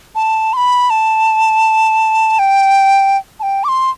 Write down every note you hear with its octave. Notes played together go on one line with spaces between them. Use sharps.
A5
C6
B5
A5
G5
A5
G5
D6
C6